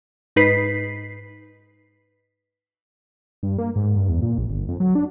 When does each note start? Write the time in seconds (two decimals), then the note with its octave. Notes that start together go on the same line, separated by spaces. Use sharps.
0.36 G#2 D#4 B4 B6 C7
3.43 G2
3.58 A#3
3.76 G#2
3.96 G2
4.09 E2
4.22 A#2
4.38 A#1
4.50 G1
4.69 F2
4.80 F#3
4.95 D4